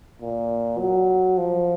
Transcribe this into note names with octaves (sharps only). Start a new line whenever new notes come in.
A#2
F#3
F3